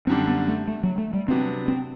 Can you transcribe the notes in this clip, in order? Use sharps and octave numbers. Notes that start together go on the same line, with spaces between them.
F#2 D3 G3 C4 D4
B3
A3
A3
F#3
A3
G3
C3 F#3 B3 C4 D4
C4